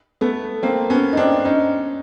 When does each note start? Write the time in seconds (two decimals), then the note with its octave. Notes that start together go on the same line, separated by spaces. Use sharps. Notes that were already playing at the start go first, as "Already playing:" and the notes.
0.21 A3 B3
0.63 A#3 C4
0.90 B3 C#4
1.13 D#4
1.17 C4 D4
1.45 C#4 D#4